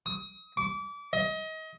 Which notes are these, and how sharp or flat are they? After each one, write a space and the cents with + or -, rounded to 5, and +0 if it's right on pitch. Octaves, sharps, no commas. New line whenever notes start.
D#6 +30
D6 -30
D#5 +30